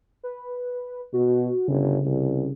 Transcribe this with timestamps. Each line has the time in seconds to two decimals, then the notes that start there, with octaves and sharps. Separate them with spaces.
0.23 B4
1.13 B2 F#4
1.68 G1 C#3
2.06 C2